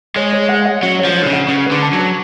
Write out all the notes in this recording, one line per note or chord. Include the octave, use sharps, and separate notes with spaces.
G#3 C#5
C#5
F#5
F#5
F#3 C#4
C#5
F3
C#5
D3
C#3
F#5
C#3 B4
B4
D3
A5
F#3
B4